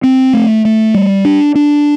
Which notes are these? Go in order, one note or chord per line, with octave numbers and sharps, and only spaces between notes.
C4
A3
A3
G3
D4
D4